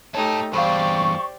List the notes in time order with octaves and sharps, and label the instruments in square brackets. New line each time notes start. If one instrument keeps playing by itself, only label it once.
[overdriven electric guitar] A2 A5 [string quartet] A3 D#4 G4 [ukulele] C#5
[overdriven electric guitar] E2 G2 [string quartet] G4 C5 D5 [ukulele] F5 B5 [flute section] C#6